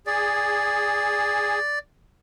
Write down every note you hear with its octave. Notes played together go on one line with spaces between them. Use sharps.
G#4 D5